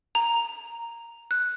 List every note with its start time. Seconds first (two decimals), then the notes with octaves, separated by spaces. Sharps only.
0.15 A#5
1.31 F#6